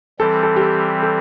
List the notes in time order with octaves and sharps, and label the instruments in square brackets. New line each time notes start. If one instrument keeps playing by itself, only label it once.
[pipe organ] E3 G3 C4 [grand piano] A4
[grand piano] A4
G4
A4
A4